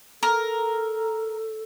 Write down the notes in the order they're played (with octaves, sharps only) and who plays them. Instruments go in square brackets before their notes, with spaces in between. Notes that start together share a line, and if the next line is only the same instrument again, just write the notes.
[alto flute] A4 [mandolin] A#4